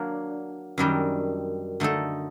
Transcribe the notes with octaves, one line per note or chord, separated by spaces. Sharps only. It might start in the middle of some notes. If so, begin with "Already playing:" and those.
Already playing: F#3 A#3 D4
F#2 D#3 G3 D4
D3 A3 D#4 A4